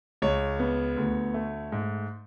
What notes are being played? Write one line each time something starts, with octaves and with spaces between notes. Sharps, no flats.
C#2 C#5
B3
D2
A3
G#2